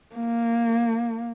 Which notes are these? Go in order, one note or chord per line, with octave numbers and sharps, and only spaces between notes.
A#3